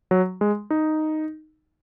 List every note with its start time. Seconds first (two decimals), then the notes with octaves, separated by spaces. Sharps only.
0.11 F#3
0.41 G#3
0.70 D#4